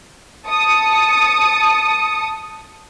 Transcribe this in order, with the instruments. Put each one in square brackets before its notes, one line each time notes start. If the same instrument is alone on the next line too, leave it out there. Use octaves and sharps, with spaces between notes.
[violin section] A5 D#6 C#7